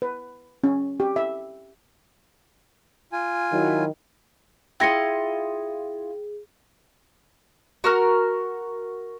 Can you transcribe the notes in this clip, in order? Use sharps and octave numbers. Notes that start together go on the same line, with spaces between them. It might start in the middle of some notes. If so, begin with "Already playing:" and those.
B4
C#4
G4
E5
F4 G#5
D#3 F#3 E4
E4 F4 G#4 D#5 G5 A#6 C#7
F#4 A#4 F6